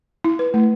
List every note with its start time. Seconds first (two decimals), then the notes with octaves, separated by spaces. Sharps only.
0.24 E4
0.39 B4
0.54 A3